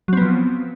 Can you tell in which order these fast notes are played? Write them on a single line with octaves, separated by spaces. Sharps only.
F#3 C4 B3 F3